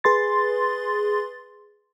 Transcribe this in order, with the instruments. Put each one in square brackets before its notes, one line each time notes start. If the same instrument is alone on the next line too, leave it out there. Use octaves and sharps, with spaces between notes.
[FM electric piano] G#4 B4 C6 A6